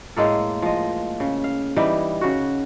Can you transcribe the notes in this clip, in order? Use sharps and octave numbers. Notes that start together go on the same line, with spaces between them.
A2 G#3 A#3 A4
F3 D#5
C#3
F5
E3 G3 D#4
C#3 F#4